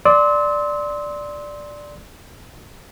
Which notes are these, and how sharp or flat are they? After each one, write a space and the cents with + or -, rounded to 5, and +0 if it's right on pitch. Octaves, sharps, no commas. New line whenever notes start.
D5 +0 C6 +0 E6 -40